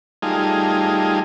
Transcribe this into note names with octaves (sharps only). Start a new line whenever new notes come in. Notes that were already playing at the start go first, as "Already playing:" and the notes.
G3 A3 D#4 F4 G#4